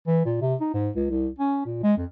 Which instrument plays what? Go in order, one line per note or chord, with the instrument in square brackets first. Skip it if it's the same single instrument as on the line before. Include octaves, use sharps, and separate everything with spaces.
[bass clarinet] E3
A#2
C3
D#4
G#2
C#2
C2
C#4
A#2
G#3
F2